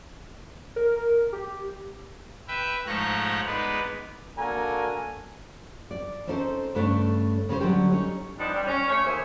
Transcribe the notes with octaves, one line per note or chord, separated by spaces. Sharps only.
A#4
G4
B4 E5 G5
G#2 F3 A3 C#5 A#5 F#6
G#3 B3 D#4 B4 D5
A#3 D4 F#4 A4 G#5 A#5
D5
C4 C#4 D#4 E4 A4 C5
G2 C#3 A3 D4 C#5
C#3 C#4 B4 C5
D3 F#3 G3 C#4 G4
C#4 D#4 C#5
F3 G3 B3 D4 D#4
G3
C#4
A3 G4 C#5
D#2 A#3 G#4 C5 E5